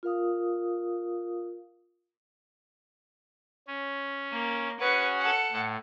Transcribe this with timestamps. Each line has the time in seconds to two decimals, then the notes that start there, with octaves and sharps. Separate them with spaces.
0.03 F4 A#4 F5 D#6
3.68 C#4
4.32 A#3
4.80 C#4 F#4 G#4 B4 C#6
5.19 A4 F#5
5.52 A2